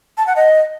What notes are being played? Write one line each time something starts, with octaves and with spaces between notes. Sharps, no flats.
A5
F#5
D#5